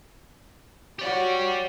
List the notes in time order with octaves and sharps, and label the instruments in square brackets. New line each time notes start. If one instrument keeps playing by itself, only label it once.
[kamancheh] F#4 C#5 [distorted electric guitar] G4 D5